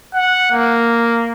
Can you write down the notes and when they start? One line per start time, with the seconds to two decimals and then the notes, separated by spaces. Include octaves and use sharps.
0.14 F#5
0.52 A#3